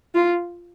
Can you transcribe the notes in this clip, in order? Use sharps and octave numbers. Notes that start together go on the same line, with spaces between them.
F4